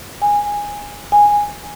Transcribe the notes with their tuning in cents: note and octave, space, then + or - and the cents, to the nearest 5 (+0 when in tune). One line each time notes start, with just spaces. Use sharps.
G#5 -15
G#5 -10